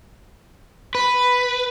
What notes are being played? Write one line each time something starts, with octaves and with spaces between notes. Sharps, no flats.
B4